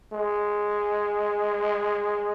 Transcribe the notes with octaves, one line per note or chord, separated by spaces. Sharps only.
G#3